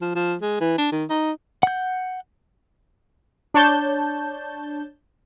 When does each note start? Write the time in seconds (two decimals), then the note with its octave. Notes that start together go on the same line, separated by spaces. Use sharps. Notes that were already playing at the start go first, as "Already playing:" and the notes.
0.01 F3
0.15 F3
0.41 G#3
0.60 E3
0.78 D4
0.92 D#3
1.10 D#4
1.63 F#5 G6
3.54 D4 C#5 A5 G6